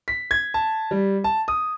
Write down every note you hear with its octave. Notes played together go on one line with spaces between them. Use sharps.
B6
G#6
A5
G3
A5
D#6